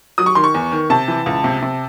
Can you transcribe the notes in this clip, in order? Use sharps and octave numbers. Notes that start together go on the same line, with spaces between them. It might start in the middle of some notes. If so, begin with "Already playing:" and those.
F#3 D#6
C#6
D#3 C6
C#6
E2
D#3
C3 A5
E3
C#2
C3
C3